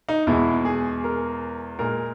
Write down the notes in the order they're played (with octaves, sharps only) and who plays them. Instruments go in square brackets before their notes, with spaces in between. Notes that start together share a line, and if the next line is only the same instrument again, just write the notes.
[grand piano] D#4
E2 B2 G#3 E4
G#4
A#4
A#2 G#3 A#4